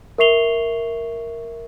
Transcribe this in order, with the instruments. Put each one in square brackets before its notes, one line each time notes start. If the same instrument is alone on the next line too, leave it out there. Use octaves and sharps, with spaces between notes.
[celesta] A#4 E5 C#6 C7 F7 G7